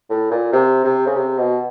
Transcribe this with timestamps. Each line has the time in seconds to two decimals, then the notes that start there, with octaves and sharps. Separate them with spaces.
0.10 A2
0.31 A#2
0.53 C3
0.85 C3
1.07 C#3
1.16 C3
1.38 B2